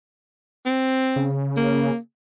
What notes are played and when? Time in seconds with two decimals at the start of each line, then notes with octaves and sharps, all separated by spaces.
0.66 C4
1.16 C#3
1.57 A#3